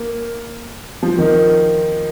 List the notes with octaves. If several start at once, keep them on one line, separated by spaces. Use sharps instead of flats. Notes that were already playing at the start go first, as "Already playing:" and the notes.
Already playing: A#3
F3
D#3